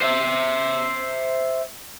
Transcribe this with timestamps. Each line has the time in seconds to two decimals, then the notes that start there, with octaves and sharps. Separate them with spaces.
0.01 C5 E5